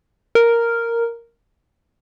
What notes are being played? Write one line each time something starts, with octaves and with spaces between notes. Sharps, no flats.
A#4